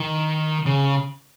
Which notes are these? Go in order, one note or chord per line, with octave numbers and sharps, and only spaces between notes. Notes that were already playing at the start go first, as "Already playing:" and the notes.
Already playing: D#3
C#3